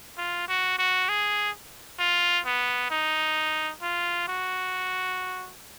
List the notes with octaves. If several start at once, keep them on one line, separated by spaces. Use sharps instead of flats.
F4
F#4
F#4
G#4
F4
B3
D#4
F4
F#4